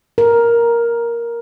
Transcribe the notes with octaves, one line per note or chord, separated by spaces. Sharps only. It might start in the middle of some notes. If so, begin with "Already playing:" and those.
A#4